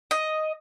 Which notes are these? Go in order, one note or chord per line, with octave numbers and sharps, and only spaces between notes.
D#5